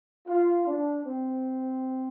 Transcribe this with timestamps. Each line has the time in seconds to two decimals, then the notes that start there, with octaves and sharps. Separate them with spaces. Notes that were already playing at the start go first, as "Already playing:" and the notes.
0.28 F4
0.67 D4
1.05 C4